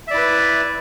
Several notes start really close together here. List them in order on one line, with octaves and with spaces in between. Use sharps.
E5 D5 E4 B4